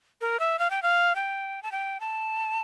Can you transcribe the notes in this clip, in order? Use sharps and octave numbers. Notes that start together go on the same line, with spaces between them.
A#4
E5
F5
G5
F5
G5
A5
G5
A5